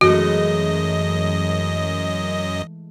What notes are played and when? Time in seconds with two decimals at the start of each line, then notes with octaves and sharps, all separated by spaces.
0.01 F#2 E3 G#3 A3 F#4 D#5